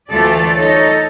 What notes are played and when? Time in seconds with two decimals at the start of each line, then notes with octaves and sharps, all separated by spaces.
0.12 D2 E3 A3 F4 A4 D5
0.57 D#4 A4 C#5